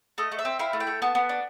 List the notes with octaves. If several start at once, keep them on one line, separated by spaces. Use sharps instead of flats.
A3 D#5
A3
E5
C4
E4 F5
A3
G5
A3
B3 A5
B3
D4